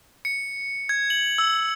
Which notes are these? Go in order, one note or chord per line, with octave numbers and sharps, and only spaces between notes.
C#7
G#6
F#7
E6